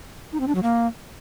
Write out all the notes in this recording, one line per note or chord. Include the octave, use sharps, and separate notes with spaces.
D#4
C4
D4
F#3
A#3